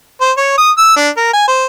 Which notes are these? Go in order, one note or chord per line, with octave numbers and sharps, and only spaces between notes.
C5
C#5
D#6
E6
D4
A#4
G#5
C5